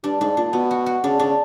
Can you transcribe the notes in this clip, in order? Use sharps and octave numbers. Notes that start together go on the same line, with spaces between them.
G2 D4
G#2 D4
A#2 D4
B2 B3
F#4
F#4
C#3 D4
C#3 D4